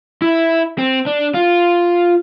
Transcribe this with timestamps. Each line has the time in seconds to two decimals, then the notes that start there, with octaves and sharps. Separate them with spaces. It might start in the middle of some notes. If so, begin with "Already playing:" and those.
0.22 E4
0.79 C4
1.07 D4
1.35 F4